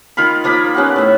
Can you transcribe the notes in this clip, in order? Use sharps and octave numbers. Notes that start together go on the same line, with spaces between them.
D#3 F4 F5 B5
F3 A#3 D#4 B5
B3 C#4 G4 F#5
A2 E5